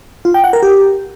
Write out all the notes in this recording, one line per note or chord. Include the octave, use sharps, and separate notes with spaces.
F4
G5
F#5
A#4
G4